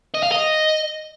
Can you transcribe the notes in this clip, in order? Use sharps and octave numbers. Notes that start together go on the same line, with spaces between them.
D#5
F5
D#5